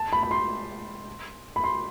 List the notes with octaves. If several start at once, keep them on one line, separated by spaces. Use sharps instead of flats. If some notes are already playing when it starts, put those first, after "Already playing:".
Already playing: A5
B5
B5
C6
B5
C6